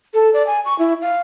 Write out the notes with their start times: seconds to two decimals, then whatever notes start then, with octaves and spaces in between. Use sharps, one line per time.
0.14 A4
0.34 D5
0.47 G#5
0.65 C#6
0.79 E4
1.02 F5